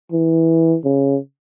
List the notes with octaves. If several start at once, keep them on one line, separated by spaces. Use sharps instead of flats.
E3
C#3